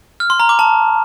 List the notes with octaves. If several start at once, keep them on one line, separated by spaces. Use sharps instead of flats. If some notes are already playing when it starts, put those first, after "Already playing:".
F6
C6
A#5
D6
A5